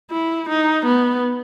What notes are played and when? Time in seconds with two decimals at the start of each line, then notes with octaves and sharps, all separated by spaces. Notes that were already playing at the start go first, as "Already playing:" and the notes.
0.11 E4
0.49 D#4
0.86 B3